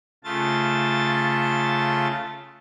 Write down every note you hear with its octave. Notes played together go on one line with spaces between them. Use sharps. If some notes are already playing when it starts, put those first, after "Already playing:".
C#3 A3 F4 A5 A6